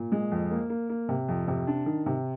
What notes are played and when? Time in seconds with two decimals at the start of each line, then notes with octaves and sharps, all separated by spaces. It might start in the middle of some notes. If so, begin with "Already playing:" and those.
Already playing: A#2
0.12 G#3
0.32 F2
0.51 A#3
0.70 A#3
0.90 A#3
1.09 C3
1.28 F2
1.48 C3
1.67 D4
1.86 D#3
2.06 C3